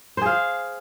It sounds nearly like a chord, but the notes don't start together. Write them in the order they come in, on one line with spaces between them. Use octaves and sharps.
C5 G#4 F5